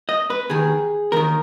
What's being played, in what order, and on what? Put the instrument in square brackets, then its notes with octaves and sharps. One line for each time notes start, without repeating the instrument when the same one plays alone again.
[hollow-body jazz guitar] D#5
B4
D#2 D#3 G#4
D#2 D#3 A#4